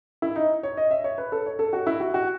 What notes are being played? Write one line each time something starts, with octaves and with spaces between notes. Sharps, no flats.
E4
D#4
C#5
D#5
E5
C#5
B4
A4
C#5
A4
F#4
E4
F#4
F#4